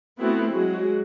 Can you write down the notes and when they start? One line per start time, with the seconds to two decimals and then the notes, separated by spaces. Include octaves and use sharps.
0.19 A3 B3 C4 E4 F#4
0.51 F#3 G#3 F#4